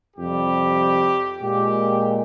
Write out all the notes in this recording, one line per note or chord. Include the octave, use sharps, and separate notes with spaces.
F2 C3 G3 G4
A#2 G#3 G4